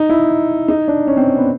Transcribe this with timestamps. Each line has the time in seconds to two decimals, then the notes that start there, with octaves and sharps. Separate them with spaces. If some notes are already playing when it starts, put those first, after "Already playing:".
Already playing: D#4
0.09 E4
0.68 D#4
0.88 D4
1.07 C#4
1.17 C4
1.37 B3